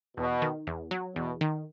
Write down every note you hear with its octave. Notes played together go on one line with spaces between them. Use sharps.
E2 B2
D#3
E2
F#3
E2 B2
D#3